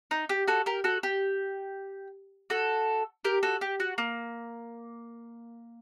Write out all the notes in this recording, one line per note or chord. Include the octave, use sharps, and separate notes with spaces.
D#4
G4
F#4 A4
G4 A#4
F#4 A4
G4
F#4 A4
G4 A#4
F#4 A4
G4
F#4
A#3